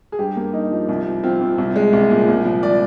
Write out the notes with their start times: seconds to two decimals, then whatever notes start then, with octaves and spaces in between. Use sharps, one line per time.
0.12 G#4
0.19 G2 G4
0.36 A#3
0.53 D#4
0.71 F3
0.89 C2
1.06 F3
1.23 C4 F4
1.41 C3
1.58 C2
1.76 G#3
1.93 C2
2.10 A#2
2.28 C2
2.45 F3
2.63 D5